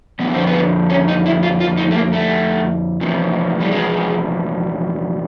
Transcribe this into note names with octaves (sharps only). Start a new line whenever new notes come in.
F2 D3 F3 B3
C4
B3
C#4
D#4
E4
F4
F4
D#4
A3
A#3
A3
E2 C3 F3
G3
G#3